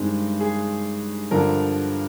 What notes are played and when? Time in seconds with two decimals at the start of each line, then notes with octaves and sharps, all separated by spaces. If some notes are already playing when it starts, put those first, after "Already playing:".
Already playing: G2 D#3 G#3 C4
0.40 G#4
1.31 G2 D3 F3 A#4